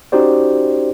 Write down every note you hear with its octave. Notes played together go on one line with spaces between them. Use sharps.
C#4 D#4 F#4 G4 C5 D5